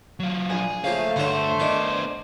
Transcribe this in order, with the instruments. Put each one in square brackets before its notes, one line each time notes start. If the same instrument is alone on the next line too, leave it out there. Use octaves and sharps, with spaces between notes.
[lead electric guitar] F#3 F4
[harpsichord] A#1 [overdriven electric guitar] G#4
[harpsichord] C#3 F3 A#3 [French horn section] A3 [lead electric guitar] F5
[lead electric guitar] D2 [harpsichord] G2 D3 C#5 [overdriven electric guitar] C5
[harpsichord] D#3 D4 [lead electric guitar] B3 D5